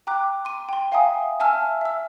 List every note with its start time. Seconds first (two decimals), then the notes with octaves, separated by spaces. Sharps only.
0.07 G5 A#5 D6 F#6
0.45 C6 D#7
0.69 G5 C6
0.92 E5 F5 G5 G#5 A#5 D#6
1.40 E5 G#5 A5 E6 F6
1.81 E5 E6